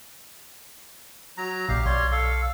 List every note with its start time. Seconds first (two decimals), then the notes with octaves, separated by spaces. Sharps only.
1.38 F#3 A#5
1.69 A#1 A#2 G4 F5
1.86 B1 G3 C#5 C6
2.12 A4 F5